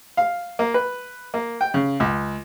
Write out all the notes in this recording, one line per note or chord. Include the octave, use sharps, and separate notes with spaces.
F5
A#3
B4
A#3
G5
C#3
C#2